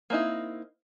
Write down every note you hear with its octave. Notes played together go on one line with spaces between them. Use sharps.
A#3 C4 D#4 E4